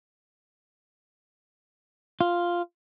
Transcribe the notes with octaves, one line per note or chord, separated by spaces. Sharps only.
F4